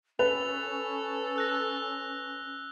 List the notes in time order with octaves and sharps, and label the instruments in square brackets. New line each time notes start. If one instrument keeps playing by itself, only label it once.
[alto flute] C#4 [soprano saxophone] A4 [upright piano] B4 [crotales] F7
[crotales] E6 F#6 A#6